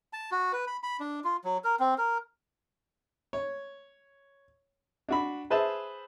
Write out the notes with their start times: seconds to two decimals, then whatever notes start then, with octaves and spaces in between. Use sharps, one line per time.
0.13 A5
0.32 F#4
0.53 B4
0.67 B5
0.83 B5
1.00 D4
1.24 F4
1.44 F#3
1.64 A#4
1.80 C4
1.98 A#4
3.33 C#5
5.08 D4 F#4 B5
5.50 G#4 B4 C5 E5 A5